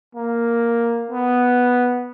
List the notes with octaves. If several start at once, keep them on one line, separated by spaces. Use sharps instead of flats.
A#3
B3